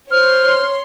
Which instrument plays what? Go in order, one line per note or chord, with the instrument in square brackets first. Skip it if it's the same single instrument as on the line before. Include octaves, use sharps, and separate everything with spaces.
[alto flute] C5 [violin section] C#5 C6 [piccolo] F6